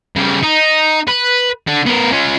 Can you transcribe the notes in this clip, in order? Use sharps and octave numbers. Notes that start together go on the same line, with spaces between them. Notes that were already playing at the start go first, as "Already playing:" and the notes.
C#3 G3
D#4
B4
D3
B3 A#4
C#4 F4